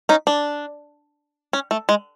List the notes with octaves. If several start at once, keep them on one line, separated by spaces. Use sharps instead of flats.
C#4 D#4
D4
C#4
A3
G#3